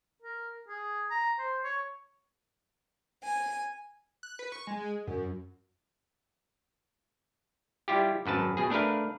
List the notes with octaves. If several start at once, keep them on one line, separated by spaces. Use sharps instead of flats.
A#4
G#4
A#5
C5
C#5
G#5
F#6
B4
C#6
G#3
F#2
G3 E4 F4 G4
G#1 F#2 B4 A5
B2 G#4
A3 D4 A#4 B4 F5